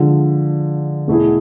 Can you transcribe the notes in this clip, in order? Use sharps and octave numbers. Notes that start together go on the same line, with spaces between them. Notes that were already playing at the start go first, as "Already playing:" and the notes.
Already playing: D3 F3 G#3
E2 B2 A3 E4 G#4